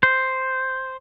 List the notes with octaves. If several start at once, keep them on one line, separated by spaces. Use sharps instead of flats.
C5